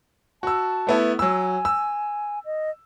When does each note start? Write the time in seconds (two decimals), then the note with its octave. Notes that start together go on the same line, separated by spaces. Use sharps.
0.43 F#4 A5 E6
0.87 A3 B3 E4
1.19 F#3 G#5 E6
1.65 E6
2.45 D#5